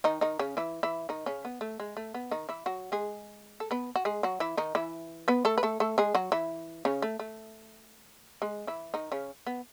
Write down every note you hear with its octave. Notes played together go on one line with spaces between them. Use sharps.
D#3 D#4
D#3 D#4
C#3 C#4
E3 E4
E3 E4
D#3 D#4
C#3 C#4
B3
A3
G#3
A3
B3
D#3 D#4
E3 E4
F#3 F#4
G#3 G#4
A4
B3 B4
F#4
G#3 G#4
F#3 F#4
E3 E4
D#3 D#4
E3 E4
B3 B4
A3 A4
B4
A3 A4
A3 A4
G#3 G#4
F#3 F#4
E3 E4
C#3 C#4
A3
A3
G#3 G#4
E3 E4
D#3 D#4
C#3 C#4
B3